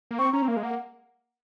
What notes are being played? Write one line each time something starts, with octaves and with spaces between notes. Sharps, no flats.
A#3
C4 C#6
C#4 A#5
C4
A#3 F5
G#3
A#3 F#5